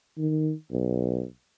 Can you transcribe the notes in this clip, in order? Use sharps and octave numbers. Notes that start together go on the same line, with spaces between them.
D#3
B1